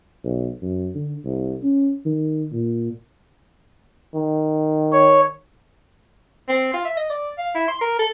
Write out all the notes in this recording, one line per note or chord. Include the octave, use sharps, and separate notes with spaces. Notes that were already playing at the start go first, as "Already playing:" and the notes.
B1
F#2
D3
C2
C#4
D#3
A#2
D#3
C#5
C4
F4
E5
D#5
D5
F5
E4
C6
A#4
A4